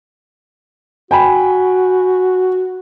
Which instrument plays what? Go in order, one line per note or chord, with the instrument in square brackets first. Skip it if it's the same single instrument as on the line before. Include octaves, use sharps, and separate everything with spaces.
[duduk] F#4 [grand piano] G5 G#5 B5